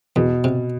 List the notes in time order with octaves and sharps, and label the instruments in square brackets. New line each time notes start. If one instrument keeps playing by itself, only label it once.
[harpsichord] E2 [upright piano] B2
[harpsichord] C3